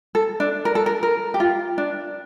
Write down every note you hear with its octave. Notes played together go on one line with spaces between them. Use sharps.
A4
D4
A#4
A4
A#4
A#4
G4
F4
D4